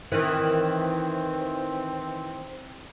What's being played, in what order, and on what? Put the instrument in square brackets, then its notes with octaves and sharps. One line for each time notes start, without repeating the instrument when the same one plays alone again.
[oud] D#3 E3 [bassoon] C4